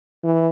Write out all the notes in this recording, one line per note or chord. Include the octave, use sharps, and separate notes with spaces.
E3